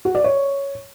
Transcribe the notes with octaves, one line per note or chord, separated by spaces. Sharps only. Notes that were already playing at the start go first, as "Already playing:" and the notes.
F#4
D5
C#5